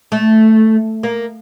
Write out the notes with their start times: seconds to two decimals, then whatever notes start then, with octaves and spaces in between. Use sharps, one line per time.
0.12 A3
1.03 A#3